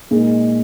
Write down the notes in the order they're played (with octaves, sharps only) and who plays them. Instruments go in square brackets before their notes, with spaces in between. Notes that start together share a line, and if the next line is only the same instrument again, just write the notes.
[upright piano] A#2 G#3 D#4